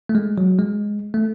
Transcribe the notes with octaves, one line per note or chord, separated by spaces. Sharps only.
A3
G#3
F#3
G#3
A3